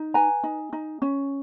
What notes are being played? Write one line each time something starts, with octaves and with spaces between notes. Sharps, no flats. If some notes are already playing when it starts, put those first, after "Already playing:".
Already playing: D#4
B4 G#5 A#5
D#4
D#4
C#4